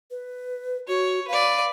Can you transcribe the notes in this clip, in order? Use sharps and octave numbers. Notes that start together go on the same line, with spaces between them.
B4
F#4 C#5
B4 D5 F5